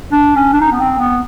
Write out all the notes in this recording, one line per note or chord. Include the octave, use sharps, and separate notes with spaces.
D4
C#4
D4
D#4
B3
C4
B3